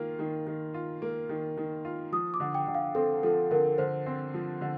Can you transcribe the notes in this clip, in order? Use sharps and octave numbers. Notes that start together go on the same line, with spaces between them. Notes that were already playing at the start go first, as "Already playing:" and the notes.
Already playing: D#3 A#3 F4
D#3
D#3
F4
A#3
D#3
D#3
F4
F3 D#6
D6
D3
G5
D3
F5
C4 A4
F3 A4
D3 A#4
D3 C5
C4
F3
D3